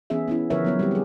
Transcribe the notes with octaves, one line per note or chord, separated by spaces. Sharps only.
E3 B3 C#4 G#4 E5
B3 C#4 E4
D3 F3 A#4 B4 C#5 E5
F#3 B3 C#5
G3 C4 G4
G4 G#4